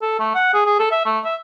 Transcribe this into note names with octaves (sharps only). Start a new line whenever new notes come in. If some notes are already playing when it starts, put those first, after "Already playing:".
A4
A3
F#5
G#4
G#4
A4
E5
A3
E5